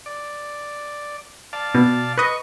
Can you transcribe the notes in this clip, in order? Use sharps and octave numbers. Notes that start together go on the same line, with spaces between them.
D5
D5 F5 A5
B2
B4 D#5 C#6